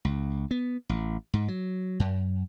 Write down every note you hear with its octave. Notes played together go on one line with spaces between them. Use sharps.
C#2
B3
A1
G#2
F#3
F#2